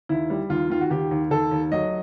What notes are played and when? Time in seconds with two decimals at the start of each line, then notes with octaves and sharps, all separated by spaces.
0.09 D#2 E4
0.30 G3
0.50 D#2 F4
0.70 D#3 F4
0.81 F#4
0.90 D#2 G4
1.11 D#2
1.31 D#2 A4
1.51 D#2
1.72 F#3 D#5